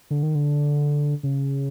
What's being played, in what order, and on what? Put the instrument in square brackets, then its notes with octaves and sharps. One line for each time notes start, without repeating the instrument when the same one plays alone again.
[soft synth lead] D3
D#3
D3
C#3